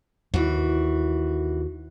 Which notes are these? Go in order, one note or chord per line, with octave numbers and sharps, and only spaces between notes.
D#2 E3 F#4